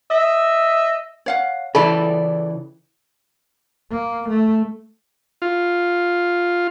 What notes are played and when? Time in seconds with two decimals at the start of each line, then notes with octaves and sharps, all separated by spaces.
0.10 D#5 E5
1.26 C#5 F5 F#5
1.75 C#3 E3 E4 A4 D5 B5
3.91 A#3
4.29 A3
5.42 F4